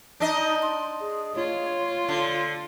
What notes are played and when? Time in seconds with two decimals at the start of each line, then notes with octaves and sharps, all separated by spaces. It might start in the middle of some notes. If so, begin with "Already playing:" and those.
0.20 D4 D#4 D#5
0.62 C6
1.01 G#4
1.36 F4 C#5
2.08 D3